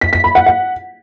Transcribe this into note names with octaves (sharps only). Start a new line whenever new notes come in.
B6
B6
B5
F#5
F#5